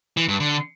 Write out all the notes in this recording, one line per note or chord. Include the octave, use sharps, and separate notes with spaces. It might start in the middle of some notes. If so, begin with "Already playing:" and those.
E3
G2
D3